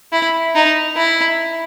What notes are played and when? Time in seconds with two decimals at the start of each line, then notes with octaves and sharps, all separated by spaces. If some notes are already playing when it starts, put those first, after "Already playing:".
0.12 E4
0.55 D#4
0.97 E4